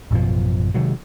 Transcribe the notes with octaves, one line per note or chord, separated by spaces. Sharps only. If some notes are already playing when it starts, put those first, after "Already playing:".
A1 F#2 B2 F3
C3 D#3 F#3 G#3